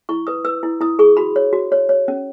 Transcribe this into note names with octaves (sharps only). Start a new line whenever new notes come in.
E4 C#6
B4 D#6
B4 E6
E4
E4 D#6
G#4 C#6
F#4 B5
C#5
F#4
C#5
C#5
C#4